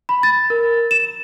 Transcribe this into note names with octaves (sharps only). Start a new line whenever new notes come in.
B5
A6
A#4
E7